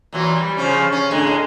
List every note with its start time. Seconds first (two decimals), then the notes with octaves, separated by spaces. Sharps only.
0.13 A#2 E3 F#3
0.36 G3
0.57 C#3 F3 C#4
0.92 C#4
1.11 A2 D3 G#3